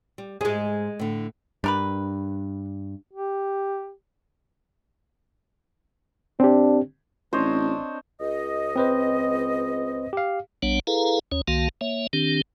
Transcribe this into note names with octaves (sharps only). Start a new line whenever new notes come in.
G3
F2 G#2 G#3 G#4
A2 D3
G2 D4 A#4 B4
G4
C4 D4 G4
A1 C4 D4 C5 C#5 D#5
C#2 D#5
C4 B4 C5
G4 F5
A#1 G3 B3 D4 C#5 F#5
E4 G#4 A4 B4 F5 A#5
D#2 C#4 C#5
C2 D#3 A#3 F#4 F5 A5
A#3 C#5 E5
D#3 C4 D4 G4